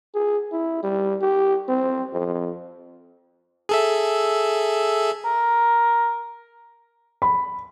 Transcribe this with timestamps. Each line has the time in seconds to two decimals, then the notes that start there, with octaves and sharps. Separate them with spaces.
0.15 G#4
0.52 E4
0.83 G3
1.21 G4
1.69 C4
2.13 F2
3.69 G#4 A4 E5
5.24 A#4
7.22 B5